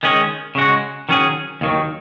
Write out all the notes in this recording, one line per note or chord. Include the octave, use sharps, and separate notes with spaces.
D#3 G#3 C#4 G#4
C#3 G#3 F#4
D#3 F#3 C#4 G#4
D#2 D#3 F#3